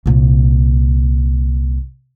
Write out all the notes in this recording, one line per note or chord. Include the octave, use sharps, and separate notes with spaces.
C2 A#2